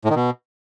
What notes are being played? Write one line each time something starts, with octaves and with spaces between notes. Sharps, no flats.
A2
D#3
B2